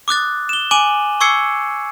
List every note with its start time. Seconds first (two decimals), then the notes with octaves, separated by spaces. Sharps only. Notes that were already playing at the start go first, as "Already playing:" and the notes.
0.08 D6 D#6 F#6 A6
0.49 E7 G7
0.71 G#5 D6 D#7 F#7
1.21 C#6 D6 E6 G#6 C7 C#7